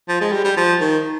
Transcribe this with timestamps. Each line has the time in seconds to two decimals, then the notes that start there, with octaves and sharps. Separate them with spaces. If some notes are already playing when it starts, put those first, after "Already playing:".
0.09 F3
0.21 G#3
0.32 G3
0.44 G3
0.57 F3
0.81 D#3